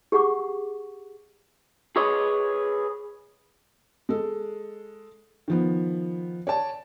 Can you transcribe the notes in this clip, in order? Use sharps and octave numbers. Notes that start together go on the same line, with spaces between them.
G4 G#4 F#5 C#6 D6
G#4 B4 C#5 D#5
G#3 A4
D#3 F3 B3
C#5 D5 A5